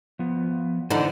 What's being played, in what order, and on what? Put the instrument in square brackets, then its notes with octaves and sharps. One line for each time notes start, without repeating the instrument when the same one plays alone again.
[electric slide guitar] F3 B3
[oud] D3 E3 D#4 [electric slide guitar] E4 C5 A5